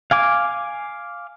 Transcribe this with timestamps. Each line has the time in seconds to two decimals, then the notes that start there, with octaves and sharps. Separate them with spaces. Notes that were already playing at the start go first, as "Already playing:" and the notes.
0.11 F5 G#5 D6